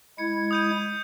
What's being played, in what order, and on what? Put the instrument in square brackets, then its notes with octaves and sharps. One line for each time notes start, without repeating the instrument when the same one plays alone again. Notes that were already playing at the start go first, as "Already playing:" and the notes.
[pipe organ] G#3 E4 G#6 [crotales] C#7
[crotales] D#6 G6 D#7